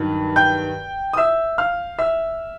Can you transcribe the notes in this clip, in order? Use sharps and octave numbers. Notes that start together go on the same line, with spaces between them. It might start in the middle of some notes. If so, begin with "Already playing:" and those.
Already playing: G2 D#3 F#3
G5 G6
D#6
E5 E6
F5 F6
E5 E6